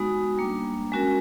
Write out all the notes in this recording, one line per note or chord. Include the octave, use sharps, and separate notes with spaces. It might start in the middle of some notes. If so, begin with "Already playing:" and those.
Already playing: G#3 B3 D#4 F#4
G3 A#3 D4
G#3 C#4 F#4 A#4